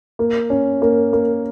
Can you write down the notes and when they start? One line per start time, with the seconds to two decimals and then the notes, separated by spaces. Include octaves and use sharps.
0.19 A#3
0.50 C#4
0.82 A#3
1.13 A#3